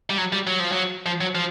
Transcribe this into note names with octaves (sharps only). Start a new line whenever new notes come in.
G3
F#3
G3
F#3
F3
F#3
F3
F#3
F3